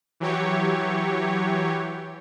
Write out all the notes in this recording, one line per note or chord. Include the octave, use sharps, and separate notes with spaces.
E3 F#3 G4 C#5